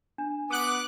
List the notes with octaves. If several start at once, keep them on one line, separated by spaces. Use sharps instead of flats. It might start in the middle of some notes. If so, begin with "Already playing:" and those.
D4
B3 D6 F#6